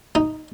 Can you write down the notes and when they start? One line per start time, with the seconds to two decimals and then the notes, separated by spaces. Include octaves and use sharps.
0.15 D#4